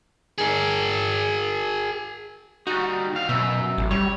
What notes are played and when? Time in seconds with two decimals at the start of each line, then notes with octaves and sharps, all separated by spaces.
0.38 G#4 A#4
2.67 G3 D#4 F#4
3.13 D#2 F5
3.29 F#2 B2 F#3 E5
3.78 A1
3.91 G3 C#5